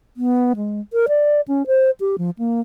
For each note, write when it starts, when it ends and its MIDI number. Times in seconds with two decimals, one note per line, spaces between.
0.17 0.53 59
0.56 0.80 56
0.93 1.06 70
1.08 1.41 74
1.48 1.66 61
1.67 1.91 72
2.00 2.16 67
2.18 2.31 53
2.39 2.61 58